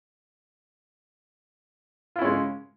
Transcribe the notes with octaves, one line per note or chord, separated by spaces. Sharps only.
G#3 C#4 E4 F4